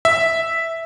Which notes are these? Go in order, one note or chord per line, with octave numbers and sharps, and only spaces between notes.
E5